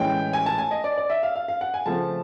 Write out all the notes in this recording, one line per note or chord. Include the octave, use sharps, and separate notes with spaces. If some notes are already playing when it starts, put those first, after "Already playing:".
Already playing: A2 E3 G#3 C#4 G5
G#5
A5
G#5
D#5
D5
D5
E5
F5
F5
F5
F#5
G#5
C#3 F3 A3 C4 A5